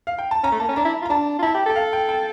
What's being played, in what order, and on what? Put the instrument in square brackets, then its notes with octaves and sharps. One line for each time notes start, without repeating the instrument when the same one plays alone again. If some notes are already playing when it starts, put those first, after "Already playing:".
[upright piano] F5
G5
A5
[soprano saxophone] C#4 [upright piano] A#5
[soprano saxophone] A3
[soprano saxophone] A#3 [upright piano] A5
[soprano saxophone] C#4
[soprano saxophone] D4 [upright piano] A#5
[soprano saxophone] E4
F4
[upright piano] A#5
[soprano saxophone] D4 [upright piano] A5
[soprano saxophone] F4
[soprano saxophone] E4 [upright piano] A5
[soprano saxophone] G4
[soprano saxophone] A4 [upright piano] G5
[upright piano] F5
G5
G5